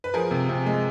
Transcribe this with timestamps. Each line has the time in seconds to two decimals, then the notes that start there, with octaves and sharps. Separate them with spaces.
0.04 B4
0.14 F3 G#4 A#4
0.31 C3
0.49 C3
0.66 G#3